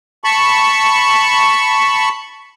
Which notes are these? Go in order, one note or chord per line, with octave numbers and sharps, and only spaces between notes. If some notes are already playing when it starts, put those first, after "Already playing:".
A5 B5 C#6